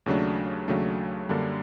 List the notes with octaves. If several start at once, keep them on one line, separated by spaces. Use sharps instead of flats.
D#2 C#3 F#3 A3 D4
D#2 C#3 F#3 A3 D4
F#2 D3 G3 A#3 D4